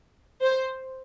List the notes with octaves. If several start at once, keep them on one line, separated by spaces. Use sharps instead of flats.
C5